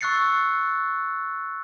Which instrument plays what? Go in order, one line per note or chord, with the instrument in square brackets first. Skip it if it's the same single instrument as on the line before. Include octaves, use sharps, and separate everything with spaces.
[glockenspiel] C#6 E6 F#6 A6 C7 C#7